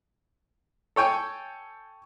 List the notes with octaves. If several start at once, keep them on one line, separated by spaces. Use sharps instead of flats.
A4 C#5 G5 G#5